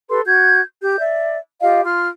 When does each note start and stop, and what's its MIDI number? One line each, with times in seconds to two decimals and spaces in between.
0.10 0.20 67
0.10 0.20 69
0.10 0.20 71
0.10 0.20 84
0.26 0.61 66
0.26 0.61 91
0.26 0.61 92
0.82 1.00 67
0.82 1.00 91
1.00 1.38 74
1.00 1.38 76
1.62 1.83 65
1.62 1.83 67
1.62 1.83 75
1.62 1.83 77
1.84 2.08 65
1.84 2.08 84
1.84 2.08 89